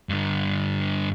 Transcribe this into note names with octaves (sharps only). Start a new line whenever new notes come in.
G2 D3